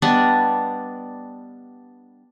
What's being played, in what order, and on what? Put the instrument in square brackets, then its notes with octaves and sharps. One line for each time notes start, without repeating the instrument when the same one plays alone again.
[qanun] G3 B3 D4 D#5